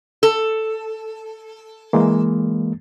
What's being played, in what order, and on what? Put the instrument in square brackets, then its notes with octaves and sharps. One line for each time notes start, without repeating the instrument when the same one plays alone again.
[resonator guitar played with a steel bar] A4
[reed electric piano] E3 G#3 A#3